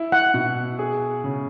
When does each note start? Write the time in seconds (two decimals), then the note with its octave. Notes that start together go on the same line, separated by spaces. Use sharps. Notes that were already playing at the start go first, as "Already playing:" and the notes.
Already playing: E4
0.12 F#5
0.34 B2
0.79 G#4
1.24 C#3